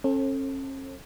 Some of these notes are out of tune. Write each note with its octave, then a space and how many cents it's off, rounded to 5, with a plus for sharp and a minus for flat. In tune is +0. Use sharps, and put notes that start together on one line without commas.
C#4 -45 A4 +10 C5 +40